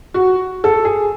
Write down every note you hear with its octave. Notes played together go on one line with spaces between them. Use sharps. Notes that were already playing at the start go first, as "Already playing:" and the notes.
F#4
A4
G#4